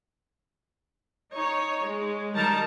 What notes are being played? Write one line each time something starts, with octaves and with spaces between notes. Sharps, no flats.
D#4 C#5
G#3
D#3 G3 D#4 A#4 A5 A#5